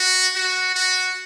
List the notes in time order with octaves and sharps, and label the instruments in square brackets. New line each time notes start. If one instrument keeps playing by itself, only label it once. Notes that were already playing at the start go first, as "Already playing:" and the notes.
Already playing: [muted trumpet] F#4
F#4
F#4